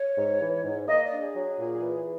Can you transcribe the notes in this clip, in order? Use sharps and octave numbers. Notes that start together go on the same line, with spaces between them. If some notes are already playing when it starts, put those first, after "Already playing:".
Already playing: C#5
G#2
E3
G#2
A#3 D#5
D5
D4
G#4
F#3
A#2
E3